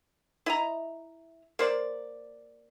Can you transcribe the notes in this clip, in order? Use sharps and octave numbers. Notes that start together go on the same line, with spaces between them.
E4 D#5 A#5
A#3 C5 D5